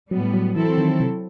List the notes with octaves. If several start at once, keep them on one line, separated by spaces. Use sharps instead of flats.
A2 F#3 G3 B3
F#3
E3 F#3 C4 E4 A4
D#3
C3